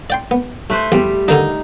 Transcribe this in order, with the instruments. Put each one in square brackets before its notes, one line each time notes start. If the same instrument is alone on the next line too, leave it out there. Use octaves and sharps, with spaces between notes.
[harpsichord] D5 G5 C6
B3
[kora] A3 B4 C5
[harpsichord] E2 [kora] G3
[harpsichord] D3 D#3 D4 [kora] D#4